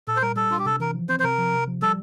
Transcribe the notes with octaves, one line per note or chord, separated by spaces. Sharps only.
A#2 A4
C5
G3 A#4
G3 A4
D4 F4
G4
C3 A4
E3 A#4
F3
C4 C5
C5
C3 A#4
F3
C3
F3
G3 A4